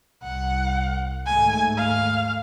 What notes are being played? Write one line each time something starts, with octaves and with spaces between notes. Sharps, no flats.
C2 F#5
D#2 G#2 A3 G#5
F5